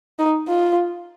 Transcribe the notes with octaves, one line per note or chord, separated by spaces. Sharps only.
D#4
F4